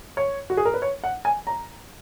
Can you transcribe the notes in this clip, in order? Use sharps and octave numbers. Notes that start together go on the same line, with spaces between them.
C#5
F#4
G#4
A#4
B4
C#5
F#5
G#5
A#5